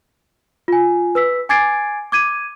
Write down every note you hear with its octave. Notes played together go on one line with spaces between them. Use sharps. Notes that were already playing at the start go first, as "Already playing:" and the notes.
F4 G#5
B4 E6 B6
G#5 D6 G#6 A6 C7 D7
D6 G#6 D#7